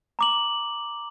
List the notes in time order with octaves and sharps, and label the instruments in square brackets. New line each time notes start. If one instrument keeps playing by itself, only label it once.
[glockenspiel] A#5 D6 F#7